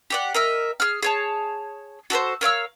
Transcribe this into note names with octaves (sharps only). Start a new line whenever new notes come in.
G4 D5 F#5
A#4 D#5 E5
G#4 F6
G#4 C#5 A5
F#4 A4 B4 C5
A#4 C#5 F5 E6